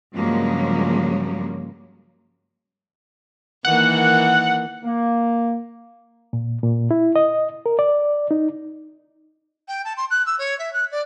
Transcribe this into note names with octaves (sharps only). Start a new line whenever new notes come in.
G2 C#3 F3 F#3 G#3 A#3
D#3 E3 A#3 F#5
A#3
A#2
A#2
E4
D#5
A#4
D5
D#4
G5
A5
C6
F#6
E6
C#5
E5
F#6
D5